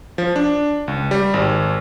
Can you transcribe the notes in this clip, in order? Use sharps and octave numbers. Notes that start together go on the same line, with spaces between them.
F3
D4
C#2
G3
G#1